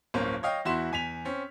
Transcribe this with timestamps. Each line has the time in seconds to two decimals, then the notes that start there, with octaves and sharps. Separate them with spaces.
0.14 D1 G1 A#3 C#4 C5
0.43 C#5 D#5 F5 G5
0.65 E2 E4 F#4 C6 E7
0.92 E2 G#5 B6 F7
1.25 C4 C#4